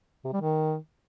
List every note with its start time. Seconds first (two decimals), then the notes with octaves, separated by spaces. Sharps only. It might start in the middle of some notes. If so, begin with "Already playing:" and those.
0.24 C3
0.33 G3
0.41 D#3